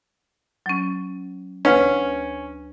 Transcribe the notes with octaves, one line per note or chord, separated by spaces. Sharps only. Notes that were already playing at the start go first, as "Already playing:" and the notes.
F#3 C#4
D2 C#4 B4